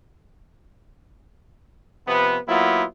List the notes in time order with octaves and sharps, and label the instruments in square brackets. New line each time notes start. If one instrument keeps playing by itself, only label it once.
[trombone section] C3 F3 B3
F#3 A#3 B3 E4 F4